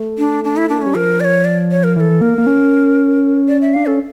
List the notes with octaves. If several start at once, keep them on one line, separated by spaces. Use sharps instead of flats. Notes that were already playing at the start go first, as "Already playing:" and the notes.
Already playing: A3
D4
D4
E4
A#3 D4
A3
G3 C#4
F3 A#4
D5
C#5
D5
C#5
A#4
E3 A4 A#4
A#3 A#4
A#3
C#4
D5
E5
D4 F5
C#4 A4